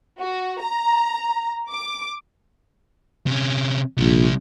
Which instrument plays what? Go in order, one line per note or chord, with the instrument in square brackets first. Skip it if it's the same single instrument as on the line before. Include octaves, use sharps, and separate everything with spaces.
[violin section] F#4
A#5
D6
[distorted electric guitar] C3 C#4
[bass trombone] A#1 [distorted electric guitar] C3 G3